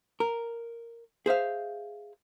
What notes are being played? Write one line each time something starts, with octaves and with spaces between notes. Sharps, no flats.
A#4
G#4 C5 E5 F5